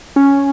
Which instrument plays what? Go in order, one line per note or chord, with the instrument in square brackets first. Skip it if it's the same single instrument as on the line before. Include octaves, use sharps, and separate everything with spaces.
[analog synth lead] C#4